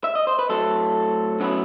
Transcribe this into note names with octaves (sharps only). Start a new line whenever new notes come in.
E5
D#5
C5
B4
A2 F#3 A3 C4 A4
F#2 F#3 B3 E4